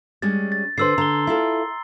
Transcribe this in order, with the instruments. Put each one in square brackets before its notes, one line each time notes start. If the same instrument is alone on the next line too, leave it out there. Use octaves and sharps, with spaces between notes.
[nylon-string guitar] G3 G#3 C#4 [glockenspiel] A6
[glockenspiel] A6
[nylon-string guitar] D3 B4 C5 [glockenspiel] C6 E6 C7
[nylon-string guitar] D3 [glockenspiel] A#5 G7
[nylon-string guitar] E4 F4 A4